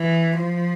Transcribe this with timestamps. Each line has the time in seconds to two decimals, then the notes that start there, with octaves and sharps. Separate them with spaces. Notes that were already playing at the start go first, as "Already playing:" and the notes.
Already playing: E3
0.38 F3